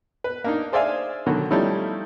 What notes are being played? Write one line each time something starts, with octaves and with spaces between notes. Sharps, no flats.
B4
A#3 D4 D#4
G#4 C5 D5 E5 F5 G#5
B2 D3 D#3 F#3 F#4
F3 G3 A3 C#4 D#4 E4